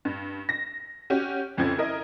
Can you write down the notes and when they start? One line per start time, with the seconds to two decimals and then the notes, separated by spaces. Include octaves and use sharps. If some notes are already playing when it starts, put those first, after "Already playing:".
0.05 G2
0.49 A#6
1.10 C#4 F#4 G4
1.57 F1 F2 C#3 F3 G#6
1.78 E4 A#4 D#5